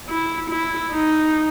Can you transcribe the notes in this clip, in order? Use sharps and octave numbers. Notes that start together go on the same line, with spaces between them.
E4
E4
D#4